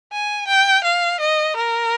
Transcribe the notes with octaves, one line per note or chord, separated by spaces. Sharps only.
G#5
G5
F5
D#5
A#4